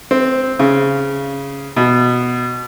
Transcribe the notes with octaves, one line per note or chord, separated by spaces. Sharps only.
C4
C#3
B2